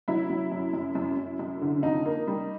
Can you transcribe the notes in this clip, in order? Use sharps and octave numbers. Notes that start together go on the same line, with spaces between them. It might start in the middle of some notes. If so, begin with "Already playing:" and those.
F#3 E4
F#3
F#2
F#2
F#2
F#2
F#2
D3
F2 D#4
A#3
G3